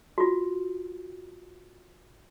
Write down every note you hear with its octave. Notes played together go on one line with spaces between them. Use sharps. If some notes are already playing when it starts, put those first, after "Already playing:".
F4 F#4